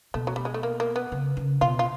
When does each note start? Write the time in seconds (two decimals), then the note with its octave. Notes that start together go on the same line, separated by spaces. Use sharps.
0.14 B2 A3
0.27 F#3
0.36 G3
0.45 G#3
0.54 A3
0.63 A#3
0.80 A#3
0.96 B3
1.12 C#3
1.37 C#3
1.61 B2 F4
1.79 F4